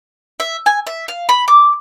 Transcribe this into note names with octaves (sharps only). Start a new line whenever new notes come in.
E5
G#5
E5
F5
B5
D6